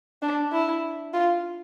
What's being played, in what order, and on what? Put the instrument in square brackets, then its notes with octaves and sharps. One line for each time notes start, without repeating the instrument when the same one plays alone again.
[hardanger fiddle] D4
E4
F4